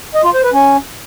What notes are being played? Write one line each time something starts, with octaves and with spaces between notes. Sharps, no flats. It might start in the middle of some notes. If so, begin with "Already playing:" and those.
D#5
F4
C5
B4
C#4